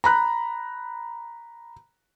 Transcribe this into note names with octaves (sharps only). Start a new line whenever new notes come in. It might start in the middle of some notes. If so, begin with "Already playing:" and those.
A#5 B5 F#6